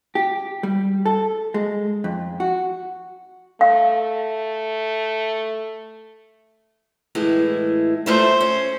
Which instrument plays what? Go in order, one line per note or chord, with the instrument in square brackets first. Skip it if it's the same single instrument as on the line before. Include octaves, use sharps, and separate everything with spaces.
[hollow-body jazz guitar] G4
G3
A4
G#3
F2
F#4
[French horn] A3 [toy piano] F5
[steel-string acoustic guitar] A2 E3 G#3
[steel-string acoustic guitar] A#2 A3 E5 [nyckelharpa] C5
[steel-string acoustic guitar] C#4